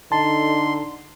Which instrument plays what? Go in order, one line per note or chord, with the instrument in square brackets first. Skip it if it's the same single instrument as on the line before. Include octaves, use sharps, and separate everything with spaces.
[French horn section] D3 D#4 A4 [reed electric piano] A5 [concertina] C6